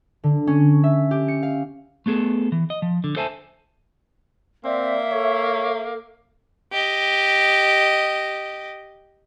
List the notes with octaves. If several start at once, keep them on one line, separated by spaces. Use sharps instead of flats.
D3
C#4
E5
G4
C#7
F5
A3 B3 G#4 A4
E3
D#5
F3
D3
A4 C5 E5 G#5 A5
A#3 C4 D5 E5
A4 C#5
G4 D#5